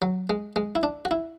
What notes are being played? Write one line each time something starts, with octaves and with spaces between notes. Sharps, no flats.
F#3
G#3
G#3
E4
D4
F#4
E4